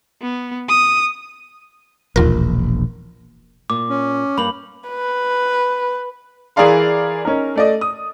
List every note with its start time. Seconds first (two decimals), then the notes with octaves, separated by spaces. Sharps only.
0.22 B3
0.69 D#6
2.16 E1 A#1 D#2 F4 A#4
3.70 A#2 D6
3.89 C#4
4.38 G2 A#3 B5 F#7
4.88 B4
6.56 E3 G#4 A#4 D5 F5 C6
7.25 C#4 D#4 A#4
7.55 A3 D5 D#5
7.81 D#6